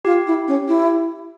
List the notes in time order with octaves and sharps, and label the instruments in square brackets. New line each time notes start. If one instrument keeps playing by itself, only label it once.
[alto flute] F4 [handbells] G4
[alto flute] E4
C#4
E4